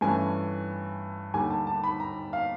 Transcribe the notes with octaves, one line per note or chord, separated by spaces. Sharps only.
G2 E3 A3 C#4 G#5
D#2 D3 G3 G#5
A5
A5
B5
A#5
F5